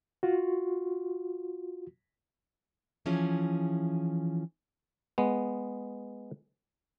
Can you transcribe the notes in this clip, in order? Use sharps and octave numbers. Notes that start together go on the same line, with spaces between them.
F4 F#4
E3 F3 C#4 G#4
G#3 B3